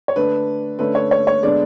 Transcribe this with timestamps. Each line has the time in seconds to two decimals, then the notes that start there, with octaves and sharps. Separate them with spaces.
0.08 C#5
0.16 D3 A3 D4 B4
0.79 D3 A3 C#4 B4
0.95 C#5
1.11 C#5
1.27 C#5
1.43 D3 G#3 B3 D4 D5